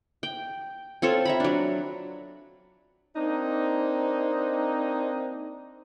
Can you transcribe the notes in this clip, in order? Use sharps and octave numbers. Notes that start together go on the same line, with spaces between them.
G5
C4 F4 A4 C#5
E5 A#5 B5
F#3 D4
A#3 C4 D4 D#4